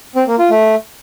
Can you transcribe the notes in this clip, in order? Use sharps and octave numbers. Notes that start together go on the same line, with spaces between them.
C4
A#3
F4
A3